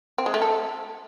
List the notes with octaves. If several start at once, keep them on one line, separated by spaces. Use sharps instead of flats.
C4
G#3
A3
A4